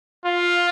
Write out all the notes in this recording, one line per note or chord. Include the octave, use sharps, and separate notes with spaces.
F4